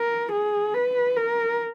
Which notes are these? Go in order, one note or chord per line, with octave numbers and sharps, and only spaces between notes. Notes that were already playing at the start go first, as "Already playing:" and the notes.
Already playing: A#4
G#4
B4
A#4